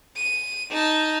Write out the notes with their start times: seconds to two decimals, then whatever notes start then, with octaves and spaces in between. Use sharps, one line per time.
0.16 D#7
0.70 D#4 A5